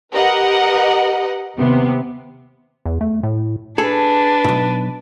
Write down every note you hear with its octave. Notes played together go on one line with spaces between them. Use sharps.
G4 A#4 B4 D#5 F#5
D#2 C3 B3
E2
A3
A2
D4 G#4 A4 B4
B1 G#2